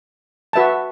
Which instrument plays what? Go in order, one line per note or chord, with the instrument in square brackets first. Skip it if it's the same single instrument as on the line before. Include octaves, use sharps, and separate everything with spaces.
[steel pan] F#4 B4 E5 A5